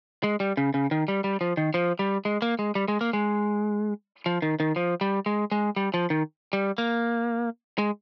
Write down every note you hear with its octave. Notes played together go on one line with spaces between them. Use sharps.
G#3
G3
C#3
C#3
D#3
G3
G3
F3
D#3
F3
G3
G#3
A#3
G#3
G3
G#3
A#3
G#3
F3
D#3
D#3
F3
G3
G#3
G#3
G3
F3
D#3
G3
A#3
G#3